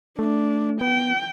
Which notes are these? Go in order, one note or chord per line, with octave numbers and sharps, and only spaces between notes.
A3 D4
B3 G5